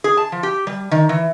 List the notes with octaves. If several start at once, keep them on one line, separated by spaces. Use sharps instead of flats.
G#4
A5
F3
G4
G3
D#3
E3